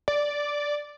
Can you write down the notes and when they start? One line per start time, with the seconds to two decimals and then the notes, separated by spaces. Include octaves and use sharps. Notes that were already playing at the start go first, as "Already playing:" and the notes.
0.08 D5